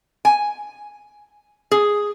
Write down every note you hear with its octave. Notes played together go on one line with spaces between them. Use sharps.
G#5
G#4